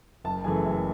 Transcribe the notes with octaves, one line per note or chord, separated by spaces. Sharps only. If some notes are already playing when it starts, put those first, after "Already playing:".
F#1 A5
F#2 C#3 E3 A3 G#5
F#1